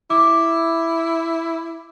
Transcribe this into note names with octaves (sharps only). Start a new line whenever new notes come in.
E4 D6